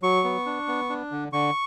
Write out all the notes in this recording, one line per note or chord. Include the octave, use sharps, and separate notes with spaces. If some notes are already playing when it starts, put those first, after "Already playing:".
F#3 C#6
B3
D4
B3
D4
D3
D3 C#6